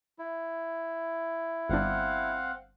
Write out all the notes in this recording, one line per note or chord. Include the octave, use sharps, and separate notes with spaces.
E4
G1 C4 D4 F5 F#5